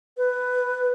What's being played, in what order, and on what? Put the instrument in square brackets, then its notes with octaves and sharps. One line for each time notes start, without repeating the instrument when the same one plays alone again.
[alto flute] B4